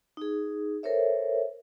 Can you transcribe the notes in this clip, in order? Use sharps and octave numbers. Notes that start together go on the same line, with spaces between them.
D#4 G#4
A4 A#4 C5 C#5 E5